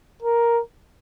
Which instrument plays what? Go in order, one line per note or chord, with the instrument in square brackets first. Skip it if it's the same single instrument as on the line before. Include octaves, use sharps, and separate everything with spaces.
[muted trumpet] A#4